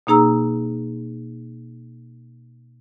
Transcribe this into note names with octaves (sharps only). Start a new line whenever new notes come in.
B2 A#3 D#4 G#4 A#5 E6